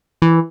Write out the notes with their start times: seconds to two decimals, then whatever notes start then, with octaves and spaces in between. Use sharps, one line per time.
0.22 E3